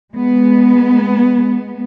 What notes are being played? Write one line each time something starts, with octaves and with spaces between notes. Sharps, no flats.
G#3 B3